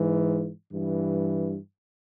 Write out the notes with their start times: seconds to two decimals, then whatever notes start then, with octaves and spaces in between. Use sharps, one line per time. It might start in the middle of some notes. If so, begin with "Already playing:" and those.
Already playing: G#2 E3
0.72 G2 E3